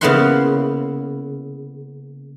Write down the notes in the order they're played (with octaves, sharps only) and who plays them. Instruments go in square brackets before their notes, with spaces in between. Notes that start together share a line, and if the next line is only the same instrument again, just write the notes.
[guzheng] C#3 A#3 B3 E4 F#5 C6